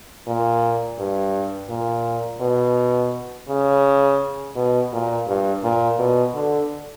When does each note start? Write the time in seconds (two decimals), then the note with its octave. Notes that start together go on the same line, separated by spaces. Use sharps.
0.27 A#2
0.98 G2
1.69 A#2
2.41 B2
3.48 C#3
4.55 B2
4.92 A#2
5.27 G2
5.63 A#2
5.99 B2
6.34 D3